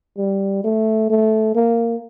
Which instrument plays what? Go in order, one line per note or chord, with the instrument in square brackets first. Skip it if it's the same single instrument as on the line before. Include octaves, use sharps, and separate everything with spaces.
[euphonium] G3
A3
A3
A#3